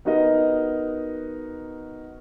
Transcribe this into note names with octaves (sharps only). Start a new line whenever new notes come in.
B3 D#4 F#4 A#4 D#5